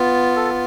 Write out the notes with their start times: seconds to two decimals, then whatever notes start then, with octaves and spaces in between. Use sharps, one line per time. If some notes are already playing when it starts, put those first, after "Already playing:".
Already playing: B3 F4
0.36 A4